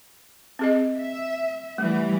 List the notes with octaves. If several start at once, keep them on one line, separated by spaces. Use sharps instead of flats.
C4 G#4 D#5
E5
E3 G3 A3